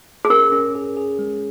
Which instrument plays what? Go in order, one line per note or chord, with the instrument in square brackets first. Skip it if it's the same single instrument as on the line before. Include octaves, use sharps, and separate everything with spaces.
[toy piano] G#4
[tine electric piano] C#4 [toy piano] A#4
[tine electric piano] C#4
G#4
G#4
G#3